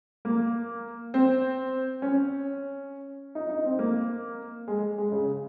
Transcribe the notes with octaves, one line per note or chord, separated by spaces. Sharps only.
A#3
C4
C#4
D#4
D#4
C4
A#3
G#3
G#3
C#3